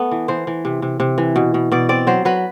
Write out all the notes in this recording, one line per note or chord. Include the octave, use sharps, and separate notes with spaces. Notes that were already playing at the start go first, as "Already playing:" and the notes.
Already playing: A3 B3
E3
E3 C5
E3
C3
C3
C3
E3
B2
B2
B2 D5
C4 D5
F#3 C5
F#3 B4